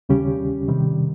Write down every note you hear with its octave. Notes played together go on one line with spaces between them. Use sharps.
D#2 C#3 G3 C#4 G4
C3 D#3 G3